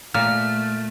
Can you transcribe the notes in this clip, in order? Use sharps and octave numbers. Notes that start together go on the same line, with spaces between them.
A#2 A3 F6